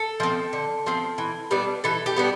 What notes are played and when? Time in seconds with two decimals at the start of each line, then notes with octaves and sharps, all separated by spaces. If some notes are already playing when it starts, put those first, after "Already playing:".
Already playing: A4
0.20 F3 C4
0.53 D3
0.86 F3 C4
1.18 E3
1.51 G3 B3 D4
1.84 E3 A4
2.06 G4
2.16 G3 B3 D4